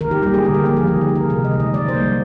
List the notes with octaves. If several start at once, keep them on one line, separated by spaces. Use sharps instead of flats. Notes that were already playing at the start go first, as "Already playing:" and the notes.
D#3 A#4
G4
G3 A#3 G4
G#4
D3 G4
A#4
F3 A#3 A#4
G#4
D#3 G4
G#4
A#3
A#4
C3 A#4
D#5
D#3 G#3
D#5
D#3 D5
C5
G3 A#3